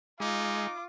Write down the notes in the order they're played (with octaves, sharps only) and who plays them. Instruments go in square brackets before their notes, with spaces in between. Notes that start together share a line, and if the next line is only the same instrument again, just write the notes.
[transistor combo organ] G#3 [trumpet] D#4 [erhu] F4 [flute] D6